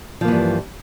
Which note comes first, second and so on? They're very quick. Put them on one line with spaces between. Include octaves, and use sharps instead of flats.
F3 A#3 E3 G2